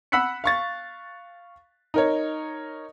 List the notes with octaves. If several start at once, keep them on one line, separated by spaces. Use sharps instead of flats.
F#5 B5 E6 F#6 B6 C#7
F5 C#6 A6
D#4 A#4 C#5